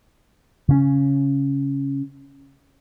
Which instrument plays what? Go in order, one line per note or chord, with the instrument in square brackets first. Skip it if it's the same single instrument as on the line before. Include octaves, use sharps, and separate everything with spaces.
[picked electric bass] C#3 C#4